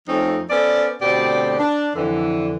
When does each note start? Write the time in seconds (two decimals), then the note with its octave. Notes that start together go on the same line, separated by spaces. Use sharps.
0.07 F2 F3 A3 C4 C#4 D#4
0.50 B3 C#4 A4 C5 D5
1.01 D2 B2 C4 G4 D5
1.59 D4
1.94 F2 D3 E3